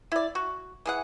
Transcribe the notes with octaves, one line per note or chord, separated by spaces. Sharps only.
E4 D5
F#4
E3 G#4 F#5